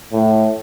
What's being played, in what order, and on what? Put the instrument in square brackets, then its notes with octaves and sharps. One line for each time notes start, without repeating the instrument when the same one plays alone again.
[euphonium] A2